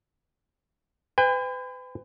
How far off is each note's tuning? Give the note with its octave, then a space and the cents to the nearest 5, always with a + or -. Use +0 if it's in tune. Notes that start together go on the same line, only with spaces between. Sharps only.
B4 +40 G5 +45